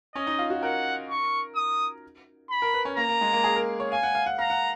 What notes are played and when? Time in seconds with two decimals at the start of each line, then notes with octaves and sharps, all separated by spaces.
0.15 C#4 D#5
0.27 D#4
0.39 F4
0.50 F#4
0.62 A#4 F#5
1.10 C#6
1.56 D#6
2.50 B5
2.62 A#4
2.74 B4
2.85 C#4
2.97 A#3 A#5
3.09 A#3
3.21 G#3
3.33 A#3
3.44 G#4
3.56 A#4
3.80 C#5
3.92 F5 G#5
4.03 F#5
4.15 F5
4.26 F#5
4.39 F5 A#5
4.50 F#5